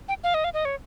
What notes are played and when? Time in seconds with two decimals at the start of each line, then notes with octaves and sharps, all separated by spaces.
0.08 G5
0.24 F5
0.34 D#5
0.44 F5
0.54 D#5
0.65 C#5